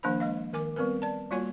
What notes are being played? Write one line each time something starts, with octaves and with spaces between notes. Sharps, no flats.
D#3 F3 A#3 D4 C5 B5
G#3 D#5 F5
D#3 A#4 G#5 D6
G3 B3 C4 A#4 B4
D5 A5
G3 A#3 F4 F#4 C#5 G#5